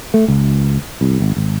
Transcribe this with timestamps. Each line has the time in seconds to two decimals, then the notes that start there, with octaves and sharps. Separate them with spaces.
0.14 A3
0.28 C#2
1.01 C2
1.20 G#1
1.36 G#1